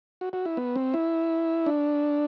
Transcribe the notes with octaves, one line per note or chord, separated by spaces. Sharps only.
F#4
F#4
E4
B3
C4
E4
D4